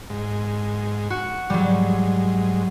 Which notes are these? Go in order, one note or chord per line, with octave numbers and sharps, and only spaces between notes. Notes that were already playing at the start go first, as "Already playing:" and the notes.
G#2
F#4
G#2 F#3 G3